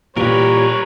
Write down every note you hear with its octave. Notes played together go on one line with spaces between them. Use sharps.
A#2 E3 G3 G4 A#4 B4 C#5